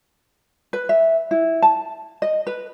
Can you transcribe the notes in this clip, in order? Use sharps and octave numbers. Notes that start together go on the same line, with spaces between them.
B4
E5
E4
A5
D#5
B4